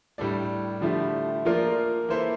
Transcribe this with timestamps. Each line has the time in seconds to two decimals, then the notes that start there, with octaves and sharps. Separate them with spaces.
0.18 A2 G3 D4 A4 D5
0.81 D3 F3 A3 E4 G4
1.45 F3 A#3 F4 A#4 D5
2.09 E3 A#3 E4 A4 C5